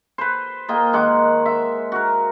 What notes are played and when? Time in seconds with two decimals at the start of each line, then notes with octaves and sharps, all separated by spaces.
0.18 B4 C5
0.69 A#3 F4 D#5 G5
0.93 D#3 G#3 F#5 D6
1.46 E5
1.92 F#4 A#4